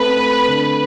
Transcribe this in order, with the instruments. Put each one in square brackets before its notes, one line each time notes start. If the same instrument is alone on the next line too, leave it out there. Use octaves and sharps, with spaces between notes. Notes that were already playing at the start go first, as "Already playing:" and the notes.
Already playing: [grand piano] A3 C4 [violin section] B4
[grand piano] A3
D3